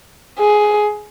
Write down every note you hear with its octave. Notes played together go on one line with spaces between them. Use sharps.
G#4